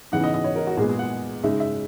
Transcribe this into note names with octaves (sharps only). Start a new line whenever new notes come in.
C#3 E3 B3 D#4 F#5
D#5
D#5
C#5
A#4
F#4
A#2 G#3 B3 G#4
G#4
F#5
C#3 G#3 D#4 E5
E5